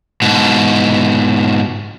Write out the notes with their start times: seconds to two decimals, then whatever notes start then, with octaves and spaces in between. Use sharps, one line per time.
0.22 G#2 B2